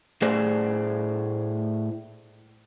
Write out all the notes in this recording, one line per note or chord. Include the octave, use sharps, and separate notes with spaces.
A2 A3 G#4 C5 D5